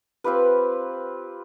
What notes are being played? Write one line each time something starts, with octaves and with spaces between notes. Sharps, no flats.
C4 F4 G4 B4